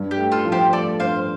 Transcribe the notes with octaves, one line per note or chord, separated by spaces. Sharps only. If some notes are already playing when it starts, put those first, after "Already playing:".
Already playing: G2
G4
A3
F4 A4
F3
G4 C5
A3 A4 D5
G2 C5 F5